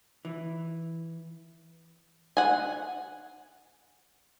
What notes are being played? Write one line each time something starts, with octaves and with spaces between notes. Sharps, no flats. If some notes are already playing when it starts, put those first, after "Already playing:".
E3
F#5 G#5